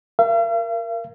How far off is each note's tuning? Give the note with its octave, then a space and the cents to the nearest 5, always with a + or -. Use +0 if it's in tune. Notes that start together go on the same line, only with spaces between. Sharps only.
A#4 +0 F5 -45